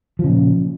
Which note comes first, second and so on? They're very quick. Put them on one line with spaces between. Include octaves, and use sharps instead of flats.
F3 C#3 A#2